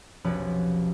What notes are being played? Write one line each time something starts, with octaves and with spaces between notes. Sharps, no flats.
F1 B1 F3 C#4 B4 A6